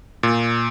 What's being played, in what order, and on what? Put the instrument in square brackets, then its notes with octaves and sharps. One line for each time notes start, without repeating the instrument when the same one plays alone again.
[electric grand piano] A#2